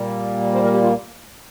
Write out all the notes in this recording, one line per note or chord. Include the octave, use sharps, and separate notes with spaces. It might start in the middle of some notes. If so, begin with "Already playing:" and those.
Already playing: A#2 G3 A#3
C5
A#4
G4
F4